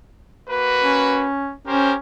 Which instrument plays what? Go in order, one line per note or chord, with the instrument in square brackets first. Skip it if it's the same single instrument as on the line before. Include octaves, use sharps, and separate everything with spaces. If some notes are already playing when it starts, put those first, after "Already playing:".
[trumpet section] A#3 F#4 B4
[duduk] C#4
[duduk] C#4 [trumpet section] G4 A#4 C5